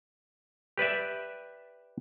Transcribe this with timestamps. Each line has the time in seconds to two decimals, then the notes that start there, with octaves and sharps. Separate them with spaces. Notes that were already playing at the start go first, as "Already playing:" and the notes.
0.78 G4 B4 D5 E5